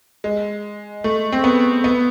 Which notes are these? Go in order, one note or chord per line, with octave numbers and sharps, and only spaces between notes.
G#3
A3
C4
B3
B3